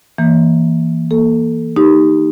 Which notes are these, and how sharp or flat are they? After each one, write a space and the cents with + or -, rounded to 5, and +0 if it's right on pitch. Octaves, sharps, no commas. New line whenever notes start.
E3 +0 A#3 +0
A#3 +5 A4 +0
D#4 +0 G4 +0